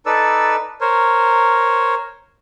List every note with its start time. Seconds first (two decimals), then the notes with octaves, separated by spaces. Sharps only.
0.06 D#4 A4 B4 D5 E6
0.81 A#4 C5 C#5